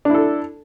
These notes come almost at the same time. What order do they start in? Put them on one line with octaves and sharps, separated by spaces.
D4 E4 A4